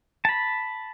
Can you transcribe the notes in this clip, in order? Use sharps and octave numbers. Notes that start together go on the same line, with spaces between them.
A5 B5